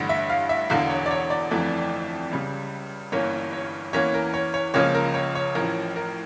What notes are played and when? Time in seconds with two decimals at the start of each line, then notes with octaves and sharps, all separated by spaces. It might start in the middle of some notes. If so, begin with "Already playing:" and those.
Already playing: A1 G2 D3
0.09 E5
0.30 F5
0.49 E5
0.70 E1 E2 D3 F5
0.89 C#5
1.06 D5
1.11 C#5
1.30 D5
1.51 G1 F2 E3 A3
2.31 C#2 C#3 G3
3.12 G1 G2 E3 A#3 C#4 C#5
3.53 C#5
3.93 E2 E3 A#3 C#4 C#5
4.14 A#4
4.34 C#5
4.54 C#5
4.74 C#2 C#3 F3 A#3 C#4 C#5
4.94 A#4
5.14 C#5
5.35 C#5
5.55 A1 A2 F3 C#4 A#4
5.96 A#4